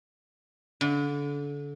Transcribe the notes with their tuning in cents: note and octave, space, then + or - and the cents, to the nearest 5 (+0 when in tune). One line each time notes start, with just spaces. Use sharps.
D3 -30